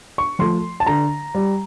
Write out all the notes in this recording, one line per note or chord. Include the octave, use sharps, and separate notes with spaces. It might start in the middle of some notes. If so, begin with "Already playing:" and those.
C#6
F3 A3 C6
A5
D3 A#5
G3